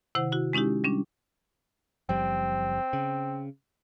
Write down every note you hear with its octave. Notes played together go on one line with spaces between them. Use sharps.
C3 D#3 E4 C5 F#5
E4 F#4
G#3 C#4 D#4 E4 G4
G3 C#4 D4
F#1 F3 G3 C4
C#3